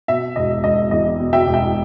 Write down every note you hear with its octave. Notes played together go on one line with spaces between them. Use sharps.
B2 E5
E1 D#5
E1 D#5
E2 D#5
B2
E5 G5
E1
E5 G5